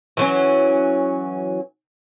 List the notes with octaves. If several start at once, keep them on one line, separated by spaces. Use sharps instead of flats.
E3 F#3 C#4